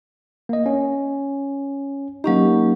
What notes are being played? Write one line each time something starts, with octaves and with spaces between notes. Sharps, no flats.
A#3 D#5
C#4
F#3 A#3 C#4 D#4 G4